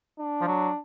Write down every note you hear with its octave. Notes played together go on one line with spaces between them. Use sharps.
D4
F3
F#3